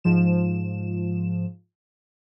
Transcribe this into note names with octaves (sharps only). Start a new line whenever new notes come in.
G#2 F3 E7